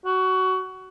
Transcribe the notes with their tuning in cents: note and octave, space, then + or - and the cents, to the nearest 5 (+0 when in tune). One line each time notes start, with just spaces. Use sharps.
F#4 +15